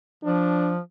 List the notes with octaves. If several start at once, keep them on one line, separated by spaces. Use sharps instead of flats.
F3 D4